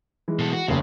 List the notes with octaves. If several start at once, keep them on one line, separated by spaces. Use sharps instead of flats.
E3 G#3
B2 A4
F#4
F1 D#2 C#3